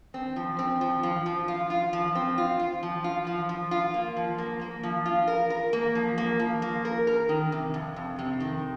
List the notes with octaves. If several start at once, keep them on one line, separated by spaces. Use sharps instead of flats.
C4
F3
C4
F3
F3
F3
F4
F4
F3
C4
F4
F4
F3
F4
F3
F3
F4
A#3
F3
A#3
A#3
F3
F4
A#4
A#4
A#3
F3
A#3
F3
A#3
A#4
A#4
D#3
C3
F2
F2
C3
D#3